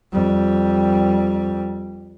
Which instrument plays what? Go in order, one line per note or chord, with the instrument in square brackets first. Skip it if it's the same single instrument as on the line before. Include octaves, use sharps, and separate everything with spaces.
[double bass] F2 G3